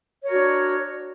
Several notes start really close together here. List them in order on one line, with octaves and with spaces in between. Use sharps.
C#5 A#4 F#4 D4